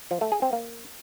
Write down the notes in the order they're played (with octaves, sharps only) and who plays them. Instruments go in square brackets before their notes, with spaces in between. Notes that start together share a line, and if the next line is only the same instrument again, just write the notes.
[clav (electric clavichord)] F3
A3
G#4
C4
A#3